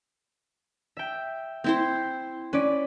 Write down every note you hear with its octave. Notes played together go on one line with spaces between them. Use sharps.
E5 G5
C4 E4 C5
C#4 B4 D5